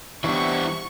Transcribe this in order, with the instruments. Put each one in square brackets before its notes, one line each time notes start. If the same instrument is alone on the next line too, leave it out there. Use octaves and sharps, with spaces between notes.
[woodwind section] C3 B3 [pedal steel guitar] E3 G3 [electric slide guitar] D4 E4 [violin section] C#6